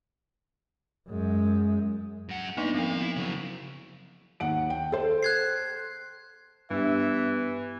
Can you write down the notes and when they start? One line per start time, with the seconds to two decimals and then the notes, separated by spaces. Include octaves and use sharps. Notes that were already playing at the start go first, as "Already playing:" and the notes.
1.09 F#2 G#3
2.29 F#2 F#5
2.57 A#3 B3 D4 D#4 B4
2.74 G2 F3 C4 F5
3.01 E4
3.16 C#3 F#3
4.40 D#2 F#5 D7
4.70 G5
4.92 A4 C5
5.23 F#6 G#6 C7
6.71 G2 E3 B3 D4 G4 E5